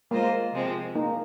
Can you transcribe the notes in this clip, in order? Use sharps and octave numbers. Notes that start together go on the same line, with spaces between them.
G#3 A#3 F4 C5 D#5
C3 F3 G#3 C4
A#3 D#4